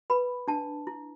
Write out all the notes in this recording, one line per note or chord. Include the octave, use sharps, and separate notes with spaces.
B4 B5
D4 A5
E4